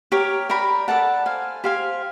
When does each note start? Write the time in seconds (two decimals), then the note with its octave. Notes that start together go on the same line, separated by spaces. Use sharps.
0.12 G4 A#4 C#5
0.49 A#4 D5 G5 B5
0.88 A4 D5 F#5 A5
1.26 C5 F5 G#5
1.64 G4 C5 F5 G#5